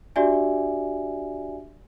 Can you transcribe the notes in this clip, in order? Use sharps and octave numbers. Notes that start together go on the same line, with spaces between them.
D4 F#4 G4 D5 E5 G#5